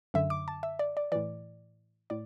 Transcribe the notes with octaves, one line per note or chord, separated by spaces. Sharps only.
F#2 D3 E5
D6
A5
E5
D5
D5
A2 E3 D5
A2 D5